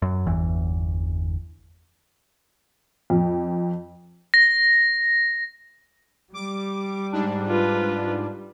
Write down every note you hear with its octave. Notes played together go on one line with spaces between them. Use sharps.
F#2
G1 E2 E3
F2
A#6
G3 D6
G#2 D4
F4 B4